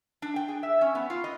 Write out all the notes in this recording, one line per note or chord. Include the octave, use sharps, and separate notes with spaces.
D4
G5
G#4
E5
C#4
B3
F4
D#5